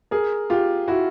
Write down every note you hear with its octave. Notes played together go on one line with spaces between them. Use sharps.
G#4 A#4
F4 G4
E4 F#4